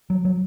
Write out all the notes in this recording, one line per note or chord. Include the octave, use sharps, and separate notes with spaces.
F#3
F#3